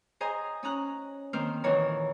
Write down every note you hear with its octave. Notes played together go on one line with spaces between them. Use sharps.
G#4 C5 D#5 G#5 A#5
C#4 D#4 A#5 F#6
D#3 A#3 C4 C5 F6
E2 A#2 D#3 E3 C#5 A#5